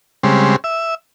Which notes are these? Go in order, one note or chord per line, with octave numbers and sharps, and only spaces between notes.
C#3 G3 G#3 C4
E5